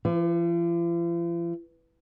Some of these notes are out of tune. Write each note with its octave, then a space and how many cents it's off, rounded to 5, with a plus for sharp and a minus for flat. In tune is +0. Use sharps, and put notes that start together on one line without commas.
F3 -45